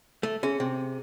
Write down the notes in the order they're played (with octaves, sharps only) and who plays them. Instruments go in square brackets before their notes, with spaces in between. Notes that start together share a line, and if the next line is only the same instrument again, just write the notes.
[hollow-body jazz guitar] A3
[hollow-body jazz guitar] C#4 [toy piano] F#4 G#4 E5
[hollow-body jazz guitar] C3